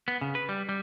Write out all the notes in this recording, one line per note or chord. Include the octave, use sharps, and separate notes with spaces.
B3
C#3
B4
G3
G3